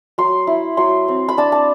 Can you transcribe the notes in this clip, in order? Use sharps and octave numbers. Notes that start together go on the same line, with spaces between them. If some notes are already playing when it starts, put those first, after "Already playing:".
F#3 C6
E4
F#3 C6
C4
B5
D4 A5
A5